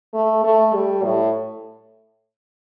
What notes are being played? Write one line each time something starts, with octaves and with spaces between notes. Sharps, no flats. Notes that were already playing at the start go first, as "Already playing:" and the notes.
A3
A3
G3
A2